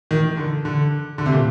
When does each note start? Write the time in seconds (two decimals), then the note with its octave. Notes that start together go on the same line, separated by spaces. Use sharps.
0.11 D#3
0.37 D3
0.65 D3
1.18 D3
1.26 C3
1.32 A#2